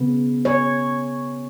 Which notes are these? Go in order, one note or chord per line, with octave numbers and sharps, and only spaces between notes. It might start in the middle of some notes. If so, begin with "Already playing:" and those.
Already playing: C#3 B3
C#5